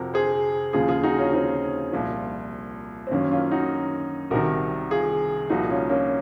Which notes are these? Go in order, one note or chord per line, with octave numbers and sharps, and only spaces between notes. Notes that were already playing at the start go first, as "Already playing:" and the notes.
Already playing: F2 C3 F3 F#4 A#4
G#4 C5
D#2 C#3 F3 F4 G#4
F4 G#4
D#4 F#4
C#4 F4
C4 D#4
C2 A#2 F3
C4
F#2 D#3 A#3 C#4
C#4 F4
D#4 F#4
C2 C3 D#3 F#4 A#4
F4 G#4
C2 A#2 F3 D#4 F#4
C#4 F4
A#3 C#4